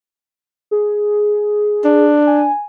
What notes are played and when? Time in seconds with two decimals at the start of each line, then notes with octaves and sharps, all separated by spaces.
0.71 G#4
1.85 D4
2.27 G#5